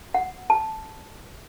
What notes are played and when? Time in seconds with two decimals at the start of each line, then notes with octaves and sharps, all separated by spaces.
0.14 F#5
0.50 A5